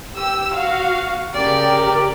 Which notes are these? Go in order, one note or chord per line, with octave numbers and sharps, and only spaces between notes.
G4 E6
F#4 F5
C#3 G4 A#4 D5